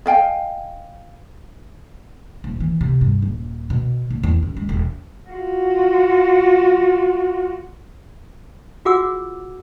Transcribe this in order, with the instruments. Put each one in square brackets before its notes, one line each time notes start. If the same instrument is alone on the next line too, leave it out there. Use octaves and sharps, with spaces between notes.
[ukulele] D#5 F5 G5 G#5
[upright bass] D#1
E3
C3
G2
D#1
B2
A#1
E2
F#2
G#3
E1
[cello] F4 F#4
[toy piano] F4 F#4 G#4 F#5 D6 E6